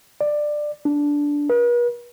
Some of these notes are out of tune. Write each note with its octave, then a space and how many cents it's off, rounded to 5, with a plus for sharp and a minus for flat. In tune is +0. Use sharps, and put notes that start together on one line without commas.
D5 +15
D4 -10
B4 -45